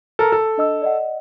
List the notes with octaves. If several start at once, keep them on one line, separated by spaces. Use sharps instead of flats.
A4 A#4
A4
D4 D#5 E6
D5 D#5 F#5